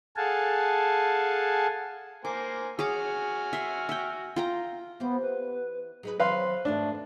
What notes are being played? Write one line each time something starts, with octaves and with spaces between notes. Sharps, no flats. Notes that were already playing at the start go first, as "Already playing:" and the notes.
G#4 A4 F5 F#5 G#5 A5
A#3 C5 G#5 D6
F#4 G#4 C#5 G#5 D6 F6
E5 C6
E5 G5
F4 G5 A#5
E3 B3 G4 C5
B4
F#3 D#4 G#4 B4
F#3 C4 B4 F5 C6
F2 G#2 F#3 A3 D4